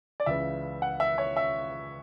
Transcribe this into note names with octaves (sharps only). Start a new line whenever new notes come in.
D5
C#2 C#3 E3 E5
F#5
E5
C#5
E5